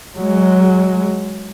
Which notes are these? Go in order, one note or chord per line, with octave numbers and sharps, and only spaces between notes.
F#3 G#3